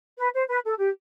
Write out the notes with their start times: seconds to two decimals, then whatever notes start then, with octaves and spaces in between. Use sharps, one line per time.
0.18 B4
0.34 C5
0.48 B4
0.64 A4
0.79 G4